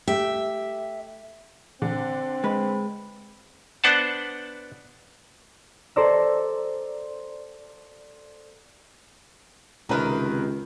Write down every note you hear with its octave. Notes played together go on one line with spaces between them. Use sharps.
A3 G4 E5
D3 C4
G#3 B4
B3 D4 C5 F#5 A5
A4 C5 D5 A#5 E6
C#2 C3 D#3 A#4 B4 A#5